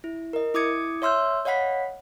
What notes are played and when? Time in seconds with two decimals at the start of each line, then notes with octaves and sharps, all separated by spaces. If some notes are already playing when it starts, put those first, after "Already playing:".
0.04 E4
0.33 A#4 D#5
0.54 E4 D6 D#6 G#6 C#7
1.02 C#5 E5 C6 E6 F6 G6
1.45 C#5 D#5 F5 F#5 B5 B6